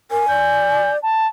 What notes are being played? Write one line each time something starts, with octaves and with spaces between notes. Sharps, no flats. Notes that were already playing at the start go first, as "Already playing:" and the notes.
A#4 G#5
D5 G6
A5